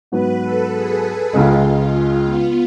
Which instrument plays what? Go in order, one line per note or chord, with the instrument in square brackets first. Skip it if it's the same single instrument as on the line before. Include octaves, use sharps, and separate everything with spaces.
[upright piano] G#2 F#3 B3 [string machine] B4
[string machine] A4
G#4
G#4
[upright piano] C#2 C#3 G#3 [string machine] F4
[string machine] F4
B3